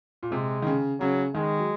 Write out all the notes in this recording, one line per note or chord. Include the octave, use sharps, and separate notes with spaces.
A#2
C3 G#3
D#3
C#3
C#3 F#3
D#3 G#3
F#3